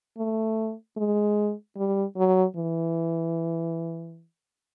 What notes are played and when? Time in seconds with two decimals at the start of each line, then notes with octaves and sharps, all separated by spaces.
0.18 A3
0.97 G#3
1.77 G3
2.17 F#3
2.57 E3